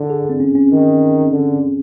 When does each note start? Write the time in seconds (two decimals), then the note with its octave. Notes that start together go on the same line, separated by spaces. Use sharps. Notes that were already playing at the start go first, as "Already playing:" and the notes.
Already playing: D3
0.10 G#4
0.30 C4
0.40 C#4
0.55 C#4
0.71 D#3
1.32 D3